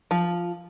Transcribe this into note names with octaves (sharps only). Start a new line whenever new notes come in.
F3